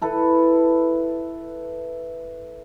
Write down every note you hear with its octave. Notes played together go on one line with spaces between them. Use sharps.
E4 A4 B4